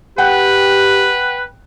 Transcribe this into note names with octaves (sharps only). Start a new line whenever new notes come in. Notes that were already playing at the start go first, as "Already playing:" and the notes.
G4 B4 F#5 G5